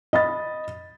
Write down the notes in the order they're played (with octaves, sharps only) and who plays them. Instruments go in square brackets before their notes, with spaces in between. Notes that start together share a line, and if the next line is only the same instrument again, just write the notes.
[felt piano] D#5 B5 A6